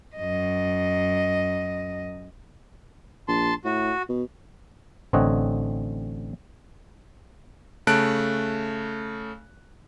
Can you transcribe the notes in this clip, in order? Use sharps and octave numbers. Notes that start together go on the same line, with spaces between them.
F#2 D#5
A#1 A5 C6
A2 F#4
B2
A1 D3 C4 C#5 D#5 F#5
C#3 A3 A5 F#6 D7